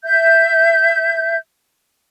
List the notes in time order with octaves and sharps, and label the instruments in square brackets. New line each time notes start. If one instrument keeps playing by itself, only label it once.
[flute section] E5 G6